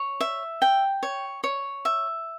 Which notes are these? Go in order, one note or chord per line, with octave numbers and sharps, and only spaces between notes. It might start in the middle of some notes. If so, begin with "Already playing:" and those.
Already playing: C#5
E5
G5
C#5
C#5
E5